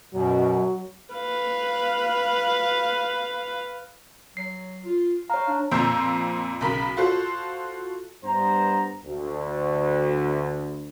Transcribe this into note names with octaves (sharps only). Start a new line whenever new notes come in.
F#2 B2 F#3
B4 F5
F#3 C7
F4
C#5 F5 A#5
D4
F2 A#2 C5 A#5 E6 G6
B1 C#3 A#4 B5
F4 F#4 A4 C5
G2 B3 C5 A#5
D2